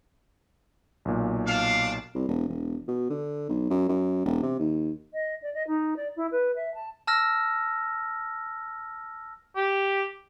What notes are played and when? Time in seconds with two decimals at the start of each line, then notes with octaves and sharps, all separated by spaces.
1.05 B1 A#2
1.46 D4 F5
2.15 C2
2.29 E1
2.48 E1
2.88 B2
3.10 D3
3.50 B1
3.70 F#2
3.89 F#2
4.26 E1
4.43 C3
4.60 D#2
5.13 D#5
5.42 D5
5.54 D#5
5.67 D#4
5.96 D5
6.16 E4
6.31 B4
6.55 E5
6.74 A5
7.07 A5 E6 F6 A#6
9.56 G4